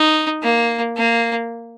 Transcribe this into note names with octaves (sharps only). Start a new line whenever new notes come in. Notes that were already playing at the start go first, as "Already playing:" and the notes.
Already playing: D#4
A#3
A#3